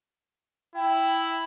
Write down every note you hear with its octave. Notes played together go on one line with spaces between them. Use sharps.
E4 G5